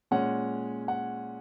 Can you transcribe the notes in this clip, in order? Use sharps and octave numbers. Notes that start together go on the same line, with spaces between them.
A#2 G#3 C#4 F#5
F#5